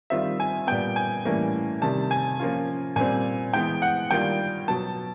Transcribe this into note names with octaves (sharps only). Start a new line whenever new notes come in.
D#3 G3 C4 F4 E5
G#5
A#2 G3 B3 G5
G#5
A2 E3 G3 A#3 C#4
C3 D#3 G3 A5
G#5
F3 A#3 C#4 F4
A#2 G3 C4 G#5
E3 G#3 B3 G5
F#5
D#3 G3 A#3 D4 F4 G5
B2 F#3 B3 A5